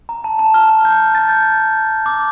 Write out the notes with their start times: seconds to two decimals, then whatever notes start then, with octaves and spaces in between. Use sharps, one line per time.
0.09 A#5
0.24 A5
0.39 A5
0.54 F6
0.70 F6
0.85 G6
1.15 A6
1.29 G6
2.06 D6